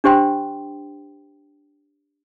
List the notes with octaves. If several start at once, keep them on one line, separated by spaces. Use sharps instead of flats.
D4 G4 C5 G5 C6